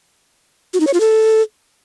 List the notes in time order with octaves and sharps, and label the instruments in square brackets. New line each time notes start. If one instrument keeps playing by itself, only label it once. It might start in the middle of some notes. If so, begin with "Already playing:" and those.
[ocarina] F#4
D#4
C#5
F4
A4